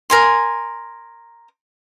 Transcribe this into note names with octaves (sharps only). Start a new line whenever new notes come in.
A#4 G#5 C6